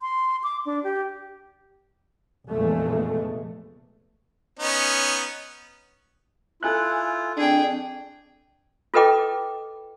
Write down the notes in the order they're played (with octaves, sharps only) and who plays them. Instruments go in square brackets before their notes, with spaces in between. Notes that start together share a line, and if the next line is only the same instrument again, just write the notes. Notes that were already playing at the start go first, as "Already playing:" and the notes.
[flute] C6
D6
D4
G4
[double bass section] F1 A#1 E2 A#2 G#3 A3
[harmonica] B3 C#4 D#4
[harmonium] E4 F4 [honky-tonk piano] A4 G#5 F#6
[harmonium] F2 [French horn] D4 [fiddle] G#4 G5
[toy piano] F4 A4 B4 D#5 G5 D6